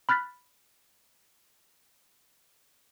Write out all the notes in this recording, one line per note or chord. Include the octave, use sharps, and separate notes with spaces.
B5 F6 F#6 A6 B6